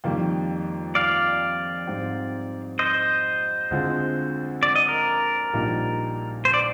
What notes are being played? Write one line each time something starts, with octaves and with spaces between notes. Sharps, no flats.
F2 D#3 G3 A#3
D5 F5
G#2 G3 C4
C5 D#5
D2 D3 G#3 C4 F4
D5
D#5
A#4 D5
A#1 A#2 G3 A#3 D#4
C5
D5